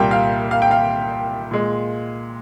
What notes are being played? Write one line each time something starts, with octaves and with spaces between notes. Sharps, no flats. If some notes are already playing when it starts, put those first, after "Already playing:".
Already playing: C2 A#2 G3 A#3 G5
F5
F5
G5
F5
A#2 G#3